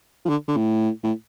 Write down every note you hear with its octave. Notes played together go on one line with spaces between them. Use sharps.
F3
D3
D3
A2
A2